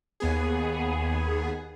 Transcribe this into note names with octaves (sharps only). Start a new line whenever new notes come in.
D#2 B3 G#4